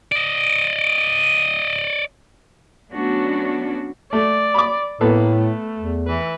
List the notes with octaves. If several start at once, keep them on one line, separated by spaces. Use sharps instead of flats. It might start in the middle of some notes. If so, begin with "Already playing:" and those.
D5 D#5
F#3 A3 B3 C#4 D4 F#4
A3 D5
B5 D6
A2 A#3 B3 A4
A3
E2
E3 B4